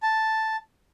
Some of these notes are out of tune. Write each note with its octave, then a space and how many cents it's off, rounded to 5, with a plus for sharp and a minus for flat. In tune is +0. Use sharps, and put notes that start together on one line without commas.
A5 +0